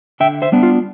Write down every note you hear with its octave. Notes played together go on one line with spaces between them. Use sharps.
D3 E5 G5
C5 E5
G3 B3 D4
F4